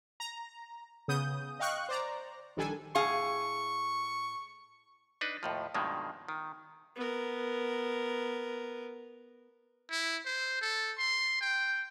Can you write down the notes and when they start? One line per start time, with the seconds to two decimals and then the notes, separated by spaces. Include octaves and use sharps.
0.20 A#5
1.08 C#3 B3 D#6 G6
1.59 D#5 F5 G5 C#6 F#6
1.89 C5 D5 A#5
2.57 A#1 D#3 G3 D4 A4 G#5
2.95 A2 G#4 F5 C#6
5.21 D4 D#4 B4
5.43 D#2 A2 F3
5.74 G2 B2 D#3 F3 G#3 A#3
6.28 D#3
6.96 B3 A#4
9.91 E4
10.25 C5
10.61 A4
10.98 C6
11.41 G5